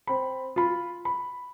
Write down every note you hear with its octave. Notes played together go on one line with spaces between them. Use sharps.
C4 B5
F4 B5
B5